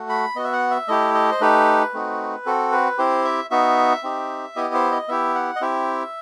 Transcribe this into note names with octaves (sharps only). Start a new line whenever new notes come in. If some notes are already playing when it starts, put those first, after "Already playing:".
Already playing: A3 F#4
B5
B3 F#4 D#5
E5
F#5
E5
A3 E4 G4 D#5
D#5
C5
A3 D#4 G4 B4
A3 C4 D#4 F#4
C4 F#4 A4
B4
C4 E4 G4 C5
E5
B3 D#4 F#4 E5
C4 D#4 G4
B3 E4 G4 D#5
C5
D#5
B3 E4 G4 E5
F#5
D#5
C4 E4 G4 E5